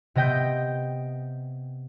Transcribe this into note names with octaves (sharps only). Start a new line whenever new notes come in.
C3 B3 D#5 G5 G6